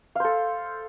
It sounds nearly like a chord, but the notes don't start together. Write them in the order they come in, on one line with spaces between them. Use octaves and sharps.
F5 C5 A4